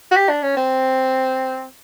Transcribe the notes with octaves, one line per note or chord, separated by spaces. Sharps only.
F#4
G4
D4
C#4
C4